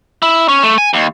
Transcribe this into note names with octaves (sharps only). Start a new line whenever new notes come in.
E4
C#4
A3
G#5
D#2